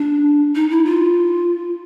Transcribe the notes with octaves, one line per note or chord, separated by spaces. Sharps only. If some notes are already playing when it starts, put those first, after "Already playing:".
Already playing: D4
D#4
E4
F4